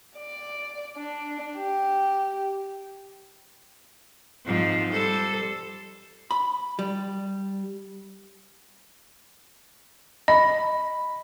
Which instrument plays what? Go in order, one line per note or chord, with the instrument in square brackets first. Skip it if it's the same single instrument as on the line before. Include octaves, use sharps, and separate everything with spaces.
[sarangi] D5
D4
G4
[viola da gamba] G#2 F3 C4
G3 A4 C5
[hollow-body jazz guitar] B5
G3
[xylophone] D#5 [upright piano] B5